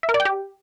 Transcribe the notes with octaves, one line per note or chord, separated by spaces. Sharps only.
E5
A#4
D5
G5
G4